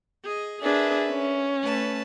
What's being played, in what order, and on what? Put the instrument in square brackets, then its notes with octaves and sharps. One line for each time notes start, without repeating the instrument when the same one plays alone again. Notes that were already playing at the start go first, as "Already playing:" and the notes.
[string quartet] G#4 D#5
[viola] D4 G#4 [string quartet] A#4 B4 E5
[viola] C#4
[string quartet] A3 B4 A5